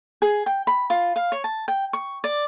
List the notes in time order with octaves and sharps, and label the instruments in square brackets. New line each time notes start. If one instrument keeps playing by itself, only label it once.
[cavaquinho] G#4
G5
B5
F4
F5
C#5
A5
G5
C#6
D5